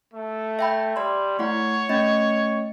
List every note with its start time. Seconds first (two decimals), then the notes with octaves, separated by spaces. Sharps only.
0.14 A3
0.59 E5 G5 B5
0.96 G3 D5 C6
1.39 A3 E4 C#5 F#5
1.89 A3 C#4 D#5